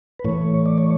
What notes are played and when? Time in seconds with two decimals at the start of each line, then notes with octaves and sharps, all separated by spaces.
0.19 B4
0.24 A2 E3 A3 C#5
0.66 D5
0.78 C#5